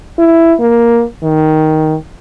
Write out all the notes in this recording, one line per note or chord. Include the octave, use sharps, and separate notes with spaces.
E4
A#3
D#3